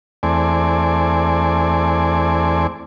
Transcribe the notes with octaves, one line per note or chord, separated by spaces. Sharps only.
E2 A3 C4 D5 G#5